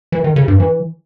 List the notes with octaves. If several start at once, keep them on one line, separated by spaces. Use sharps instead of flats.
E3
D#3
C#3
G2
E3